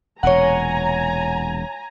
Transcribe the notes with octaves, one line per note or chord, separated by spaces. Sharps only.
E1 A#2 C#5 F#5 G#5 A#5